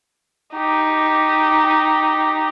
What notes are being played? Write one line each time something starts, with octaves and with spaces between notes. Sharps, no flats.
D#4 G4